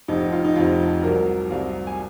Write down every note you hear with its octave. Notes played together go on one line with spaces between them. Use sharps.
F1 F2 C3 F3 D#4
D#4
F4
D#4
F1 F2 C3 F3 F4
C2 C3 F#3 A#4
C2 C3 F#3 F5
G#5